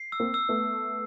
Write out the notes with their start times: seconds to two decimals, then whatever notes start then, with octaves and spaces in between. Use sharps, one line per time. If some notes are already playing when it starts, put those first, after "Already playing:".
Already playing: C7
0.12 E6
0.20 A#3 C4
0.34 E6
0.49 A3 B3